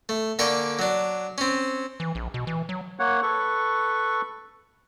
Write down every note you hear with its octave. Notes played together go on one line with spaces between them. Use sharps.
A3
D3 A#3 A4 D5 G#5 C#6
F#3 D4
C4 C#4
E3
A#1
B2
E3
F#3
A#3 C#5 F#5
A4 B4 C#6